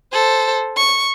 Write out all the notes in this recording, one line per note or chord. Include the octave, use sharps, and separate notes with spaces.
A4 C5
C#6